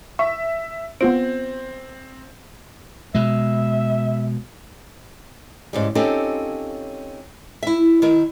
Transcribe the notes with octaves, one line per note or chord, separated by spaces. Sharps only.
E5 C#6
B3 C4 F4 D7
B2 G#3 E5
G#2 C#3 G3
C4 C#4 D#4 F4 G4 A4
E4 E5
D#3 E4 A#4